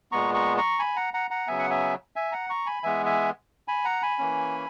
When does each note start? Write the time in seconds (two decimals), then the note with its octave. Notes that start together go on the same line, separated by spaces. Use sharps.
0.12 A#2 G#3 B3 A#5 C#6
0.34 A#5 C#6
0.57 A#5 C#6
0.79 G#5 B5
0.96 F#5 A#5
1.14 F#5 A#5
1.30 F#5 A#5
1.47 C#3 F#3 B3 E5 G#5
1.59 F#5
1.70 E5 G#5
2.16 E5 G#5
2.32 F#5 A#5
2.50 A#5 C#6
2.66 G#5 B5
2.83 E3 G#3 B3 E5 G#5
3.06 E5 G#5
3.68 G#5 B5
3.85 F#5 A#5
4.02 G#5 B5
4.18 E3 A#3 C#4